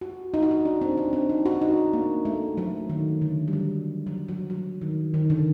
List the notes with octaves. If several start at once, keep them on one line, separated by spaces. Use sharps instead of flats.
F#4
D#4
F#4
D#4
D4
C4
D4
C4
D#4
F#4
D#4
D4
A#3
A3
F#3
D#3
D3
G3
F#3
F#3
F#3
F#3
D#3
D#3
D3